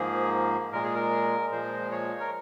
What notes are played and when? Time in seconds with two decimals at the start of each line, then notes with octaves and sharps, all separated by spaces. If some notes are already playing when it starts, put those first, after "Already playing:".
Already playing: G#2 F3 A#3 G#4
0.72 A#2 G#3 A#4
0.83 G#4
0.94 A#4
1.52 A#2 F3 G#3 C5
1.91 C#5
2.20 A#4